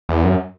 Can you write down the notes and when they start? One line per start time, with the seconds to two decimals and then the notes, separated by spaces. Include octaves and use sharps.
0.09 E2
0.24 F#2